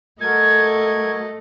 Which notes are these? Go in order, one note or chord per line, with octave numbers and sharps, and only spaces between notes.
A3 F#4 A4 A#4 D#5 G#6